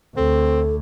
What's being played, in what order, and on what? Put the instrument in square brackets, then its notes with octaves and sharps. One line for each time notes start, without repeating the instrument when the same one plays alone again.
[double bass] D2 [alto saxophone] C4 [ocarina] A4